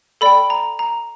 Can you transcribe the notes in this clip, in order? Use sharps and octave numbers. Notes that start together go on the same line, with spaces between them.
A4 D5 G5 B5
A#5
A#5